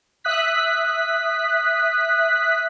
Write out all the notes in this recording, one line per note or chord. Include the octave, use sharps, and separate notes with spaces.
E5 D#6 F#6 B6